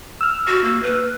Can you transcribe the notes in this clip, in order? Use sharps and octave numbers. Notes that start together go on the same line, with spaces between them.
E6 F6
F#4
A#3
B4